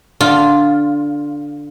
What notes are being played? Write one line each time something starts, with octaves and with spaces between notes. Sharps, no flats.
D3 F4